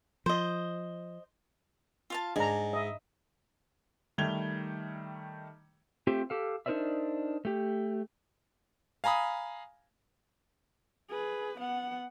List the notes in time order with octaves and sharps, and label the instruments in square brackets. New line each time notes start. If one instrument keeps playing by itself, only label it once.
[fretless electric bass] F3 [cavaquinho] C5 D#5
[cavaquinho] F4 F5 A5
[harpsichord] G#2 [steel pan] D4 A#5 [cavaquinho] G#5
[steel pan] D#5 E5
[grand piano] D#3 G3 A3 G#6 F7 G7
[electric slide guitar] A3 C4 F4 G4 C5 E5
G4 A4 F5
D4 D#4 A#4 C5 D5 E5
A3 G4
[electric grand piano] F5 G#5 A#5 B5 D#6
[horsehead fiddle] G#4 B4
B3 F#5